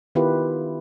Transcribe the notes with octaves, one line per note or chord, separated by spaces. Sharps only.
D#3 B3 E4 F4 G4 B4